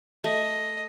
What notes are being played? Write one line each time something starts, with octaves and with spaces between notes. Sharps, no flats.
A3 D#5